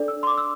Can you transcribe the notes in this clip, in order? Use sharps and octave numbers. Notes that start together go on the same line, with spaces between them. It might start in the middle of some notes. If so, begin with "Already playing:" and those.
Already playing: D4 A4 D5
E6
C6
D6
E6